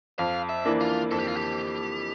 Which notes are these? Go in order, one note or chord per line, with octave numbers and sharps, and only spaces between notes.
F2 F5
E5
E3 A#3 D4
F4
F2 A4
G4
F4
G4